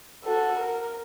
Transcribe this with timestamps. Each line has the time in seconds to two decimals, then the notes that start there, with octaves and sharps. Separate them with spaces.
0.24 F#4 A4
0.60 A#4